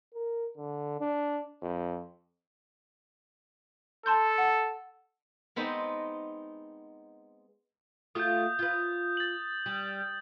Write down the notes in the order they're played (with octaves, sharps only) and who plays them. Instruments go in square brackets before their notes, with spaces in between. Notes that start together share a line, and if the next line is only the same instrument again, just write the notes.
[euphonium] A#4
D3
D4
F2
[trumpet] A4 [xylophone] A5 C6 G6
[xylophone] F#5
[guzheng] G#3 B3 C4 D#4 D5 D#5
[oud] A3 F4 F#4 [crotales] D#6 G6
[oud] F4 B4
[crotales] A6 F#7
[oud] G3